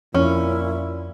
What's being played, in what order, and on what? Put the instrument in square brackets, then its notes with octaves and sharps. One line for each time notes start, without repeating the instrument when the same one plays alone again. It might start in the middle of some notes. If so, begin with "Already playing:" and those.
[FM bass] F2 [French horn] A#2 [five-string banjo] C#4 [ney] E4